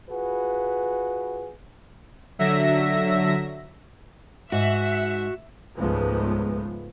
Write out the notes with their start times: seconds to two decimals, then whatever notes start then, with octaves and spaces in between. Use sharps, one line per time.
0.10 F4 F#4 G#4 B4
2.39 D3 F#3 E5 A#6
4.52 G#2 F#4 E5
5.79 C#2 G#2 F3 G#3 A3 B3